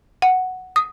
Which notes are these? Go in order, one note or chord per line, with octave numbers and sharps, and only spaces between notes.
F#5
D#6